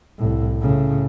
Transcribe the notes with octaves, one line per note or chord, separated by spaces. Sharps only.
C2 A2
A2 C#3